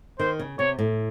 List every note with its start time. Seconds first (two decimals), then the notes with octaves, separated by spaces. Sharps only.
0.19 D#3 C5
0.39 C#3
0.59 C3 C#5
0.79 A2